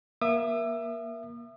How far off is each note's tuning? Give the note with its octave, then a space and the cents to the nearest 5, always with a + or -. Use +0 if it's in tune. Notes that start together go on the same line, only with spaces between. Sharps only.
A#3 +25 E5 +15 D#6 -40